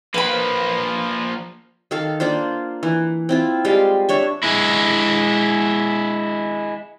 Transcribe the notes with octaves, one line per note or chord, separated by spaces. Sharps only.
F3 A#3 B4 B5
D#3 A4 F5
A#3 D4 F4 C5
E3
C4 E4 F4
G3 G#3 G4 F5
D4 C#5 E5
G#3 E4